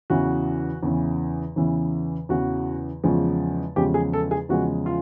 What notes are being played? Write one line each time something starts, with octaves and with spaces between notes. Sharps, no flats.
E2 C#3 E3 F#4
E2 C#3 E3
E2 C#3 E3
E2 C#3 E3 F#4
E2 C#3 F3 G#3
E2 C#3 F3 G#3 G4
G#4
A4
G#4
E2 C#3 F3 G#3 F#4
F4